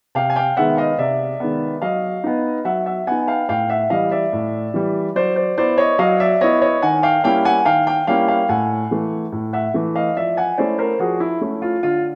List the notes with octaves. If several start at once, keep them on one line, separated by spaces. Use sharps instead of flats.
C3 F5 G5
G#5
F5 G5
D#3 G#3 B3 E5 F#5
D#5 F5
C3 D5 E5
D#3 G#3 B3
F#3 D#5 F5
B3 D#4
F#3 E5 F#5
E5 F#5
B3 D#4 F#5 G#5
F5 G5
A2 F5 G5
E5 F#5
E3 G3 D#5 F5
D5 E5
A2
E3 G3
F#3 C5 D5
C5 D5
B3 E4 C5 D5
C#5 D#5
F#3 D#5 F5
D5 E5
B3 E4 C#5 D#5
C#5 D#5
D#3 F#5 G#5
F5 G5
G3 A#3 C#4 E4 F5 G5
F#5 G#5
D#3 F5 G5
F5 G5
G3 A#3 C#4 E4 F5 G5
F5 G5
A2 F#5 G#5
E3 A3
A2
E5 F#5
E3 A3
D#5 F5
F3 D5 E5
F#5 G#5
A3 C#4 E4 C5 D5
A#4 C5
F3 F#4 G#4
E4
A3 C#4 E4
F4
D3 F4